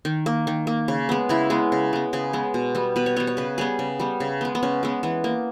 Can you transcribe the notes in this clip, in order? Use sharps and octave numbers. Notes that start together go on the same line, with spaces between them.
D#3
A#3
D#3
A#3
C#3
G#3 B3
C#3 E4
G#3 B3
C#3
G#3 B3
C#3 G#4
G#3 B3
B2
G3 B3
B2 B4
C#5
G3 B3 C#5
C#5
C#3 B4
G3 B3 G#4
C#3
G3 B3
C#3
G#3 B3
B3
C#3 C#4
G#3 B3
E3 B3
A#3